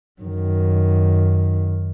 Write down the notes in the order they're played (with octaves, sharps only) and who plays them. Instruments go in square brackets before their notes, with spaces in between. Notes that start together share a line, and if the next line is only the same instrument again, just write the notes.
[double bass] F#2 D#3